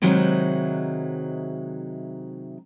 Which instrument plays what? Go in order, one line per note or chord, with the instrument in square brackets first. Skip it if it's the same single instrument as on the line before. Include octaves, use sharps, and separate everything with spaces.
[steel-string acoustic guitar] C3 D#3 F#3 G#3 D#4 E4